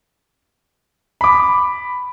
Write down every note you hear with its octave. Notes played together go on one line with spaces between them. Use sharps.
B5 D6